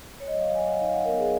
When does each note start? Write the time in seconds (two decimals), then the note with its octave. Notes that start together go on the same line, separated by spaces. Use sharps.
0.20 C#5
0.27 F#3 D#5
0.40 F5
0.53 F#3 G#5
0.66 F#5
0.79 D#4 F5
0.93 F#5
1.05 B3 A#4
1.18 G#4